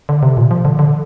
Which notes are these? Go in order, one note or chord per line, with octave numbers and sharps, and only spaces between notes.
D3
C3
A#2
F3
D3
D3